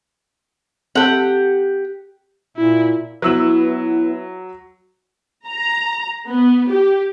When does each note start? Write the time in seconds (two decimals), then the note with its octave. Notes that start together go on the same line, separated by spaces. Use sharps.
0.95 C4 G4 A4 F#5
2.57 A#2 E4
3.22 F#3 B3 E4 B4 E6 F#7
5.46 A#5
6.27 B3
6.72 G4